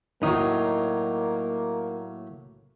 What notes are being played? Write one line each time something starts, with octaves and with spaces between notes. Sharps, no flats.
A2 F#3 A#3 D#4